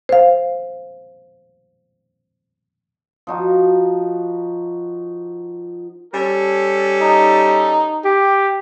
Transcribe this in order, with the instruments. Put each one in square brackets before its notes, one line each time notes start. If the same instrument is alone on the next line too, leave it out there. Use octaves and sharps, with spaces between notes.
[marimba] C5 F5
[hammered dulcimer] F3 D#4 F#4
[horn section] G3 C#4 A4
[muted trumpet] D#4
[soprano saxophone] G4